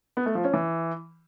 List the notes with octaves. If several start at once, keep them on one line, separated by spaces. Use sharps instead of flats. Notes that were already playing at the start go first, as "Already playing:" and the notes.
B3
A3
F3
C#4
E3